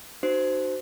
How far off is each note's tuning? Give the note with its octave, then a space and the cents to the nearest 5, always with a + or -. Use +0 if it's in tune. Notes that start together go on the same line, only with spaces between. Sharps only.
D#4 -40 F#4 +20 C5 -15